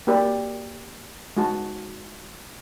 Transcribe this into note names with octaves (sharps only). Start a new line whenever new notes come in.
A#3 F#4 G4 A#4 D5 B5
G#3 F#4 A5